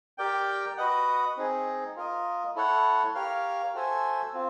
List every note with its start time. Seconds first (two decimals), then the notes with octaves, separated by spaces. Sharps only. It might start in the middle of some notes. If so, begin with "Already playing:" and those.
0.18 G4 A#4 D5 G5
0.77 F#4 B4 D#5 F#5
1.37 C4 D#4 G#4
1.96 F4 A#4 D#5
2.55 E4 A4 C#5 F#5
3.15 G4 A#4 C#5 F5
3.74 F#4 A4 C5 E5 G#5
4.34 C4 F4